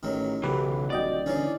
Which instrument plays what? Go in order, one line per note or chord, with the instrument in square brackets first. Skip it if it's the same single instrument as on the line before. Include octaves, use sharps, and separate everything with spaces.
[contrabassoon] A1 [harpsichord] D#3 F#3
[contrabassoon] B1 [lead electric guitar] C#3 E3 [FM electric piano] G4 B4
[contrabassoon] D#1 [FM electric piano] F#4 D#5 G5 [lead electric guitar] D5
[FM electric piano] D3 E3 [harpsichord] C#4 D#4 G#4